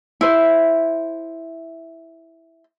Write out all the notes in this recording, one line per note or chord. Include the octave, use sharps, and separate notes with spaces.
E4 C5